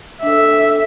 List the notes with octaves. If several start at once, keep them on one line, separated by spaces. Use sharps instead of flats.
D4 A4 E5